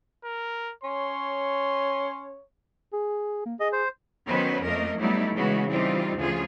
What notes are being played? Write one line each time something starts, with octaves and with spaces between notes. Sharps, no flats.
A#4
C#4 C#5 C6
G#4
A#3
G#4 D#5
C5
D#3 F#3 B3 C#4 B4 C5
F2 A3 A#3 A#4 D#5
F#3 G3 A3 B3 D#4 E4
C#3 E3 G#3 B3 F#4
E3 G3 C4 D#4 F4
D2 C#3 F3 F4 G#4